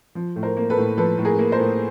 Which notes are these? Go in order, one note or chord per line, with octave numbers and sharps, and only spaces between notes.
F3
A2
A#4 C5
A#3
A4 B4
A2
F3 A4 B4
A2
G#4 A#4
A#3
A#4 C5
A2